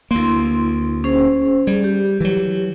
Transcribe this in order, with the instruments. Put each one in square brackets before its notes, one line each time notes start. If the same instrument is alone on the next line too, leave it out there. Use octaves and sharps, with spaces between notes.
[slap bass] D2 A#3 [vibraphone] E4 C6
[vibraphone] C#4 G#4 C5
[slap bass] G3 [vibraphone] G#4
[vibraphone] G4
[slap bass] E3 F#3